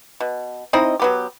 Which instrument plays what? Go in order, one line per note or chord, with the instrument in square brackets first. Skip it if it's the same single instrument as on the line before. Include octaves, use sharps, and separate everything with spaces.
[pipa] B2
C4 D#4 E4 D#5
F#3 B3 G4